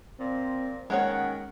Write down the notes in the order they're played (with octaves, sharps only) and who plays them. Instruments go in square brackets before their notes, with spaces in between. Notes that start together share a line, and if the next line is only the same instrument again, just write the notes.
[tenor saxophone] A#2 [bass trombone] C4
[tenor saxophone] D#3 [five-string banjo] G#3 A#3 C#5 [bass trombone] C#4 [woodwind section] F#5